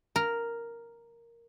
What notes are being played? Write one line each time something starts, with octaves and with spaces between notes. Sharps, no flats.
A#4